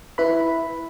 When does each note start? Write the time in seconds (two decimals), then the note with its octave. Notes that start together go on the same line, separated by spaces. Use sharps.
0.18 E4 B4 B5